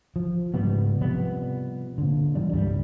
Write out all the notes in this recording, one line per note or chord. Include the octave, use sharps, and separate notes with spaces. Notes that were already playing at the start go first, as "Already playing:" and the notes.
F3
G#2 C#3 G3 B3
C3 F3 G3 B3
A#2 D3
E3 G3 D4
C#2 G2 G3